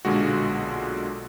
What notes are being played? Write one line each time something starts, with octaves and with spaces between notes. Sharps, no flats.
B1 A#2 D3 G#3 F#4